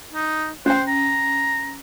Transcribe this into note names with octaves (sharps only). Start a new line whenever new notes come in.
D#4
C#4 C5 G5
A#5